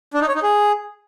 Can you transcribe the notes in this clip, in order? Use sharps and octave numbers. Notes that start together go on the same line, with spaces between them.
D4
D#4
C#5
D#4
G#4